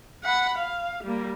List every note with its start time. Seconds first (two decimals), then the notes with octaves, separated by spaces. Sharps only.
0.24 F#5 B5
0.58 F5
1.04 G3 A#3